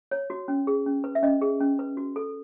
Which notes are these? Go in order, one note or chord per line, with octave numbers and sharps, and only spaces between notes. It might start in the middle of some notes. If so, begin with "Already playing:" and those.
C#5
F#4
C#4
G#4
C#4
B4
E5
C#4 D#5
G#4
C#4
B4
F#4
A4